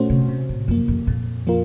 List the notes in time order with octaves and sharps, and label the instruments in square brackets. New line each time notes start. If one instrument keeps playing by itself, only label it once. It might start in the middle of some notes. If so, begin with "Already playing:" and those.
Already playing: [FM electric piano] A#2 A3 C#4 F#4 C5
[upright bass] C3
[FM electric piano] C3
[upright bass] A2
[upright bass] F#2 [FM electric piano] F3 A#3
[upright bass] F2
[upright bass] F2 [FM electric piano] A#2
[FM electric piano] F3 A#3 F4 A#4